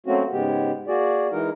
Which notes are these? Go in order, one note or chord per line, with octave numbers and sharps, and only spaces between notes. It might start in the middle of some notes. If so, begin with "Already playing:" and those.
F#3 A3 A#3 C4 C#4 F#4
G#2 C#3 G#3 B3 G4
A#3 F#4 G#4 D5
E3 G#3 D#4 A#4